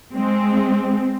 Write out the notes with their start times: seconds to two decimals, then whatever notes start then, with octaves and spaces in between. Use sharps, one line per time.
0.14 G#3 C4